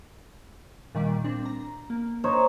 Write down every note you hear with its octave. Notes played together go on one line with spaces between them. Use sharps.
A#2 D#3 G3
C4 D4
A#5
A#3
D#4 C5 C#5